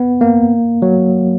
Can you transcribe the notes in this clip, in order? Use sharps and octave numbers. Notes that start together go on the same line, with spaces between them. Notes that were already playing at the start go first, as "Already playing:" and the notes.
Already playing: B3
A#3
F#3